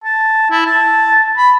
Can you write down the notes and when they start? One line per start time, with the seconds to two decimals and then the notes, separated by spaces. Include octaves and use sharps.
0.04 A5
0.51 E4
0.66 A5
1.37 B5